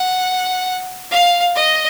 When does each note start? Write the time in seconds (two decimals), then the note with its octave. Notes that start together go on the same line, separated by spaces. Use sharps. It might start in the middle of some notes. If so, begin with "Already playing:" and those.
Already playing: F#5
1.11 F5
1.55 D#5